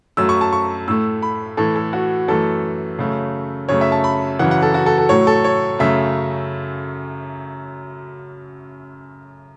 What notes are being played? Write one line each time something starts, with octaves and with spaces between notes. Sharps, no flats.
F#2 F#3 A3 E6
C#6
A5
C#6
A2 A3 E6
B5
A2 E3 A3 A4
A4
F#4
F#2 E3 A3 A4
F#2 C#3 A3
F#2 C#3 A3 C#5
E5
A5
B5
F#2 C#3 E3 F#5
F#5
A4
F#4
A4
A4
A2 F#3 A3 C#5
A4
C#5
F#2 C#3 A3 E5